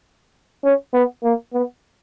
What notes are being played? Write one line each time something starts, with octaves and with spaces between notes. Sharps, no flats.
C#4
B3
A#3
B3